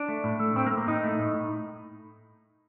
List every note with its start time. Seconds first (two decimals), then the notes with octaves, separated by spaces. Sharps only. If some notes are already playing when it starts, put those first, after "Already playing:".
Already playing: D4
0.09 A3
0.24 A2
0.40 A3
0.55 A2 C4
0.66 A#3
0.72 A3
0.78 A#3
0.87 A2 D#4
1.04 A3
1.20 A2
1.34 A2